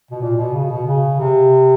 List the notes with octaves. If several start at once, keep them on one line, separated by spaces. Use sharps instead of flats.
B2
A#2
B2
C#3
B2
C#3
C3